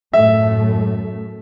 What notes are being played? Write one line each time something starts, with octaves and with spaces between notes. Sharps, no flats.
F#2 A2 A3 E5